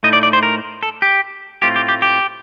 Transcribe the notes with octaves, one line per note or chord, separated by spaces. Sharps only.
A2 A3 D#4 D#5
D5
D5
C5
A#4
A4
G4
A2 A3 C4 F4 G4
G4
G4
G4